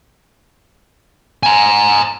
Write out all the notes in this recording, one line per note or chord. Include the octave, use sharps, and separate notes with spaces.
G#5 A#5